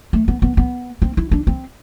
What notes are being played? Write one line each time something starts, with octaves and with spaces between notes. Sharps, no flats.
A3
B3
B3
B3
C4
E4
D4
C4